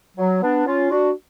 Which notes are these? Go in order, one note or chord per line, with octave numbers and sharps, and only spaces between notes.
F#3
B3 D4
C#4 F4
D4 F#4